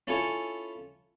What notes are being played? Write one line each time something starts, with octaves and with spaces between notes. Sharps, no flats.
C#4 E4 F4 A4 G#5 C#6